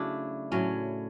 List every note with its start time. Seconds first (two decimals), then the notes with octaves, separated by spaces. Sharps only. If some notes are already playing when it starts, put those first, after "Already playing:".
Already playing: C#3 F#3 A3 C#4 D4 E4
0.52 A2 F#3 C#4